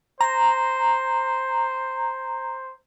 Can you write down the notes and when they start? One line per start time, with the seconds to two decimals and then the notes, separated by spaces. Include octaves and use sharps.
0.21 C5 A#5